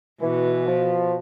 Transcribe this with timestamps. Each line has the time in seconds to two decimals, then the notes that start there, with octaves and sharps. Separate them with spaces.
0.21 B2 E3
0.66 F3